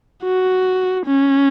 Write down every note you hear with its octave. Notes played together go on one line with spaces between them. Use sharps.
F#4
C#4